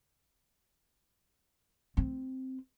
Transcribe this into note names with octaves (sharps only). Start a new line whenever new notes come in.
C4